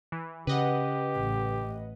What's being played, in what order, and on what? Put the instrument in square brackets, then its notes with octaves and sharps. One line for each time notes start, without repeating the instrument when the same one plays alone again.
[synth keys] E3
[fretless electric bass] C#3 [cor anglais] G4 [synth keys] B4 D#5 F#5
[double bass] A1